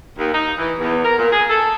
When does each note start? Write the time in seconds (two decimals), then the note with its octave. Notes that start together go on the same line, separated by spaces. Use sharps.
0.18 D#2
0.33 D#4
0.58 E3
0.79 E2
1.04 A#4
1.18 A#2
1.31 G#4
1.49 A4